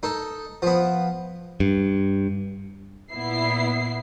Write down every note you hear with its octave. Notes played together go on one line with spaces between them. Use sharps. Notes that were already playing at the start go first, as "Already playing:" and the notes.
D#4 A4
F3 B3
G2
A#2 B3 E4 C7